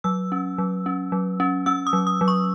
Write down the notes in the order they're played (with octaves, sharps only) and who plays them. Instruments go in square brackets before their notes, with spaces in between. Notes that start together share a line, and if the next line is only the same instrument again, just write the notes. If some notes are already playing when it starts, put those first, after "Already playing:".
[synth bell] F#3 E6
C#4
F#3
C#4
F#3
C#4
C#4 E6
D#6
F#3
D#6
F#3
C#6